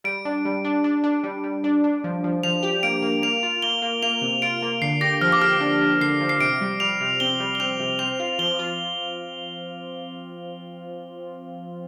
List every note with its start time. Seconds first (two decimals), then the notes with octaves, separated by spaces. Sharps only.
0.04 G3 D7
0.25 D4
0.45 G3
0.65 D4
0.84 D4
1.04 D4
1.23 G3
1.44 G3
1.64 D4
1.84 D4
2.04 F3
2.24 F3
2.43 F3 F7
2.63 G4
2.83 A#3 D7
3.02 A#3
3.23 A#3 F7
3.43 F4
3.62 A#3 G7
3.82 A#3
4.03 A#3 F7
4.21 C3
4.42 F4 D7
4.62 A#3
4.82 D3 C7
5.01 G4 A#6
5.21 F3 F6
5.32 D6
5.41 G4 F6
5.61 D4
5.81 D4
6.01 D3 C7
6.21 F3
6.29 C7
6.40 C3 D7
6.61 G3
6.80 G3 F7
7.01 C3
7.20 C4 G7
7.40 G3
7.55 G7
7.60 C4 F7
7.79 C3
7.99 C4 F7
8.20 F4
8.39 F3 G7
8.59 F4